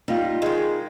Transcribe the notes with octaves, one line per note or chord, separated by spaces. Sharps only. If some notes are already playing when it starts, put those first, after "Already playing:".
G3 D#4 F4
D#3 G#3